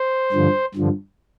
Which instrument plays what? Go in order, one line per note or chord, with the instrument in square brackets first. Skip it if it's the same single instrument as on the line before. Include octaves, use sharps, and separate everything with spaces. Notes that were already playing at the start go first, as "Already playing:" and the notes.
Already playing: [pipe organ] C5
G2 D3 F3
G2 D3 F3